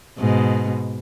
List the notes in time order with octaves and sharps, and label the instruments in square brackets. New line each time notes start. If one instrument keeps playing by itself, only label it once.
[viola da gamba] G#2 B2